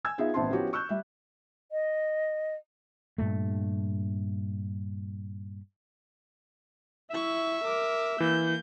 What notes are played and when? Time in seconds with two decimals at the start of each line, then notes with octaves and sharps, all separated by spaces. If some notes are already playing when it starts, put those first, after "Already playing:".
0.05 G#5 E6 G#6
0.18 B3 D#4 F4 G#4 E5
0.34 A1 B3 C4 E5 A5 C6
0.50 F3 B3 C#4 E4 F#4 G4
0.73 C#6 E6 F#6 G6
0.89 G3 E5
1.72 D#5
3.18 G2 A#2 A3
7.11 E4 E5 C#6
7.64 A#4 D6
8.20 E3 A#3 G6